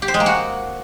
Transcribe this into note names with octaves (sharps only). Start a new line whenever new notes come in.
G4
C5
G#3
A#3
F#4